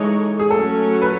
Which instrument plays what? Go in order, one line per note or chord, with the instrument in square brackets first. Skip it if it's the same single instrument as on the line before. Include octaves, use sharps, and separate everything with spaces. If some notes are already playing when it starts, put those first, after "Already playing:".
Already playing: [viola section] E3 G#3 D#4 A4 C#5
[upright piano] G#4
[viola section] F#3 A3 C#4 [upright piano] A4
[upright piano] B4